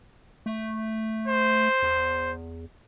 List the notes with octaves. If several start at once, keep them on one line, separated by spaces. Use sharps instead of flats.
A3
C5
E2